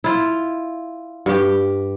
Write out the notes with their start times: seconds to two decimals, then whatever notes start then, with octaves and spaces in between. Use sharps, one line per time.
0.04 E4 F4
1.26 G2 G4